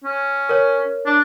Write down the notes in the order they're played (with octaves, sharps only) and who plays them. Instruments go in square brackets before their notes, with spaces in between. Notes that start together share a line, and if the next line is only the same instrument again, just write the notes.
[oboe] C#4
[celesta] A#4 C#5
[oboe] D4